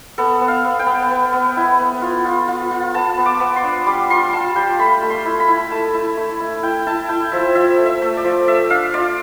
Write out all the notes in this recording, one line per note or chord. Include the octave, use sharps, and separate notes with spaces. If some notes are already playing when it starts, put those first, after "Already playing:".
B3 A4
B3
F5
B3
G5
B3
B3
B3
E4
B3
F4
F4
F4
F4
B3 A5
B3
D6
B3
C6
D4
G3 D6
F4 C6
F4 A5
G3 G5
A3 B5
A3
C6
E4
B5
E4
A3 A5
E4
A3
E4
E4 G5
E4 A5
E4 G5
F3 E5
F3 E5
A3
E5
A3
D5
F3
A3 E5
D4 F5
F4 D5